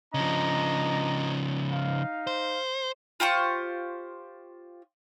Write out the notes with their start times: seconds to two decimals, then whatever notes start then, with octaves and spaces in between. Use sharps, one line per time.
0.14 C#3 F3 D4 D#5 A#5
1.73 D#4 F5
2.27 C5
3.20 F4 G4 C5 C#6